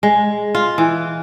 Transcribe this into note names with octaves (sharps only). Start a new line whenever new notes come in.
G#3
F4
E3